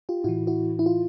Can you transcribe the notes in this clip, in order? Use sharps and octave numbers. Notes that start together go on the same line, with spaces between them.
F4 G4
A2 E3 E4 F#4
E4 F#4
E4
F4